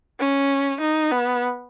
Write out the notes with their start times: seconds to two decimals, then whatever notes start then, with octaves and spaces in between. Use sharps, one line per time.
0.20 C#4
0.81 D#4
1.12 B3